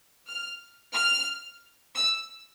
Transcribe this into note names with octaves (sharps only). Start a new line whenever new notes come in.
F6
F6
E6